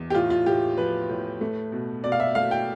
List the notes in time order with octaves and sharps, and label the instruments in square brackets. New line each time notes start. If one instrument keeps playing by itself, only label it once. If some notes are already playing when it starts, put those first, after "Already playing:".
Already playing: [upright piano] E2
G4
A2 F4
F4
A2 G4
F3 B4
A2
A3
B2
B2 D5
F5
E5
A3 F5
G5